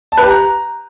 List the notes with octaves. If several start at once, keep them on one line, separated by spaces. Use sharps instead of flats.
A5
B4
G4
A#5